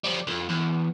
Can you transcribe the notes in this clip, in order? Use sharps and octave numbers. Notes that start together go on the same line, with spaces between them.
F3 G3
B1 F2
E2